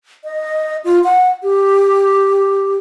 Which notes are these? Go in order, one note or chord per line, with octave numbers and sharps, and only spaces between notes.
D#5
F4
F#5
G4